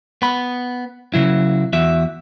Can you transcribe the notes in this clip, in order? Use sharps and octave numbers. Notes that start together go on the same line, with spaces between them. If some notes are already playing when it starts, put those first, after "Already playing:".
B3 B5
C#3 F#3 E4
E2 F#4 E5